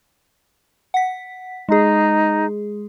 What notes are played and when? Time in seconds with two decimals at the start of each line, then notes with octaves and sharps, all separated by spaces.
0.94 F#5 B6
1.69 G#3 D#4 G#4